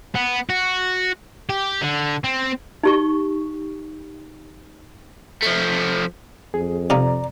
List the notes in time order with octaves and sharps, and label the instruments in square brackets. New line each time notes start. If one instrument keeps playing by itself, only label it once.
[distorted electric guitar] B3
F#4
G4
D3
C4
[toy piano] D#4 G4 C#6
[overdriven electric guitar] F3 A3
[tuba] F2 [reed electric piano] G#4
[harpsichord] C3 D#4 F4 [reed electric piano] D5 A#5